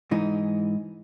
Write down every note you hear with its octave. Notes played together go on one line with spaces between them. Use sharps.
G#2 E3 D#4